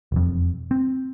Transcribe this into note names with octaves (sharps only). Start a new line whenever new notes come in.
E1 F2
C4